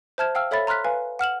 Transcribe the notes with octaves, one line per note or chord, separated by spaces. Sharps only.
C5 E5 A5 F6 G#6 E7
F5 G5 E6 F6
A4 C#5 E5 B5 A6
A#5 C6 F6 F#6 B6
B4 F5 G#5
F#5 F6 E7 F#7